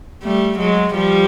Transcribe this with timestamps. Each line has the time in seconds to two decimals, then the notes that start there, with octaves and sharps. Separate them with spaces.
0.23 G3 A3
0.59 F#3 G#3
0.94 F3 G3